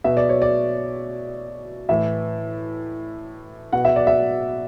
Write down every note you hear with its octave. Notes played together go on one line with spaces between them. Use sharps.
B2 E5
D5
C#5
D5
A2 E3 E5
B2 F#5
E5
D5
E5